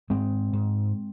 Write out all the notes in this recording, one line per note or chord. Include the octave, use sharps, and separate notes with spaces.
G#2 G#3 C4
G#2